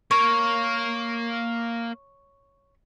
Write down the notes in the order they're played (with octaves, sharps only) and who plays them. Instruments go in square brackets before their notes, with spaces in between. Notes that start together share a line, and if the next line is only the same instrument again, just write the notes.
[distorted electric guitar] A#3 A#4 [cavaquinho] C#5